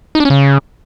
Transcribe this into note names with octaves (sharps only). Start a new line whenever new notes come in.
D#4
D4
C#4
C#3